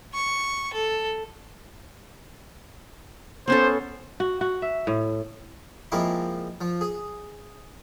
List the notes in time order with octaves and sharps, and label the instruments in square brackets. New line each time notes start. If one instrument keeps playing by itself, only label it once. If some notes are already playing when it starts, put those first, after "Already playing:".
[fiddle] C#6
A4
[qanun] B3 C#4 A4 [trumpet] C5
[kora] F#4
F#4
E5
A2
[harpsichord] F3 G#3 A#3 C4 E4
F3
G#4